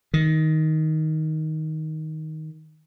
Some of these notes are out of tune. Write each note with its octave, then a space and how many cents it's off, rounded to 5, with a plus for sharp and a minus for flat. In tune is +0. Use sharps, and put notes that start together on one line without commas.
D#3 +10